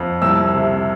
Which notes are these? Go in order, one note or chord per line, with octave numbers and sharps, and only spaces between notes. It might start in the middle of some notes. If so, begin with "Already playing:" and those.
Already playing: F2
C2 E6
C3